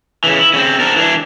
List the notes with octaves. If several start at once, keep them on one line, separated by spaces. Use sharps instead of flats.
C#3 E3
E4
C#3 C4
D4 A#4
E3 D4